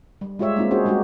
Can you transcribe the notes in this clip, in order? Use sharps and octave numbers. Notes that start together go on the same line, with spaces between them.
G3
G#3 F4 G4 C#5 E5
G#3 A#3 C4 D#4 F4
C#4 D#4 F#4 G#4 C5 C#5
G3 G#3 D#4 F#4 G4